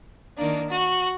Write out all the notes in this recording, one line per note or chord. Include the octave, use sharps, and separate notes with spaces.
D#3 A#3 D4
F#4